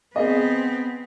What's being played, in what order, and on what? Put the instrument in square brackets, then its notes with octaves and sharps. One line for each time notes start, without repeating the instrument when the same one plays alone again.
[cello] B3 C4 [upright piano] G#4 D#5